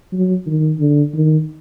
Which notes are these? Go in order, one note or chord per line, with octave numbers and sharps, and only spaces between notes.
F#3
D#3
D3
D#3